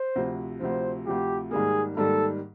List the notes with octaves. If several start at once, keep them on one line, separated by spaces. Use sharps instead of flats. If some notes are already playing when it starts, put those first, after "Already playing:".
Already playing: C5
D2 C3 F3
D2 C3 F3 C5
D2 C3 F3 G4
G#2 D#3 G3 A#3 G#4
G#2 D#3 G3 A#3 A4